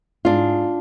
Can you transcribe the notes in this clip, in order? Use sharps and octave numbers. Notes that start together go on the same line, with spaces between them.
G#2 D4 F4